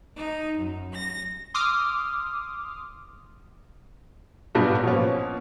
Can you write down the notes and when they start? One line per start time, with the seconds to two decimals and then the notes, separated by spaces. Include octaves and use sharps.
0.16 D#4
0.57 F#2
0.92 A#6
1.54 C6 D6 D#6 F6
4.55 G2 B2 F#3 G3 D4 F#4
4.83 B2 F3 A#3 C#4